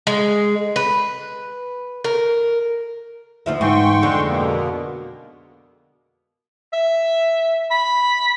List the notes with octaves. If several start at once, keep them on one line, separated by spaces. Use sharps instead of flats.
G#3
B4
A#4
D2 F3 E5
G#2 E3 G5 C6 C#6
F2 D3 G#3
B2 A#3 B3
E5
B5